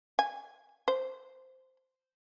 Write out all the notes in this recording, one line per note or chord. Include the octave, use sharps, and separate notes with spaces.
G#5
C5